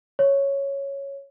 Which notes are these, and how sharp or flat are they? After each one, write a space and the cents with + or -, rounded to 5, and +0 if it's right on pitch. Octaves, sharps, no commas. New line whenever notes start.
C#5 +0